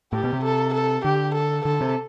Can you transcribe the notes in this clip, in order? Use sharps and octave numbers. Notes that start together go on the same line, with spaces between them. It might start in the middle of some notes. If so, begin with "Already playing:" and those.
A2 G4
B2
C3
A4
A4
D3 G4
A4
D3 A4
C3